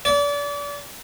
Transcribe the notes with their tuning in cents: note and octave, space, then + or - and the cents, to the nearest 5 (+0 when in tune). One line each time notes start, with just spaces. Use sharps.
D5 -35